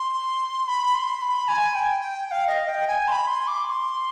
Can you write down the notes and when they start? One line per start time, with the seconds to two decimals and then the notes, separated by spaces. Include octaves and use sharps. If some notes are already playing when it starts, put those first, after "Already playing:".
Already playing: C6
0.68 B5
0.95 C6
1.22 B5
1.48 G#5
1.75 G5
2.01 G5
2.27 G5
2.31 F5
2.47 D#5
2.68 G5
2.88 G#5
3.08 C6
3.12 B5
3.27 C6
3.48 D6
3.66 D6
3.70 C6